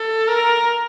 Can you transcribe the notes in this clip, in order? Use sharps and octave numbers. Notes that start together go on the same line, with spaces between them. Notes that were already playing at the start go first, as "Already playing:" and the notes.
Already playing: A4
A#4